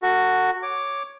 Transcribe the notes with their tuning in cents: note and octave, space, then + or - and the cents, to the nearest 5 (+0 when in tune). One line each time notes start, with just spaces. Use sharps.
F#4 +0 A4 +40
C#5 +0 D6 +0